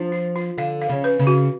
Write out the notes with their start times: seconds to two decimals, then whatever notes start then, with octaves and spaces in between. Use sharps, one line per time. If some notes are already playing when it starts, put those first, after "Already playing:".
Already playing: F3 D4
0.12 F4
0.36 F4
0.58 D3 F5
0.82 F5
0.89 C#3
1.04 B4
1.19 C#3
1.27 F#4